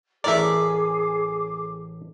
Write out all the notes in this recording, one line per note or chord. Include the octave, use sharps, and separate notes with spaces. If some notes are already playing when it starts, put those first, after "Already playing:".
A1 A2 G#4 A#4 D5 E5 D6